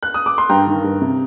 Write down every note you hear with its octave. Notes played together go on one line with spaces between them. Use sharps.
F#6
D#6
D6
C6
G2 G5 A#5
D#3
G2
C3